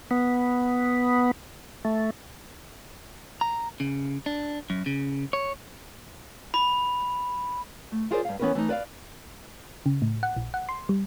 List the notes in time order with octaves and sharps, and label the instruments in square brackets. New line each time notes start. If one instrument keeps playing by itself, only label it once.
[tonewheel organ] B3
A3
[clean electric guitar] A#5
C#3
D4
F#2
C#3
C#5
[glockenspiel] B5
[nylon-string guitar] A3
E4 F4 G#4 A#4 C5 D5
G2 F5
E3 B3 C#4 E4 A#4 B4
E3 A3 C#4 D#4
B4 D5 E5 F5
[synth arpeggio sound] C#3
A2
F#5
A#1
F#5
C6
G3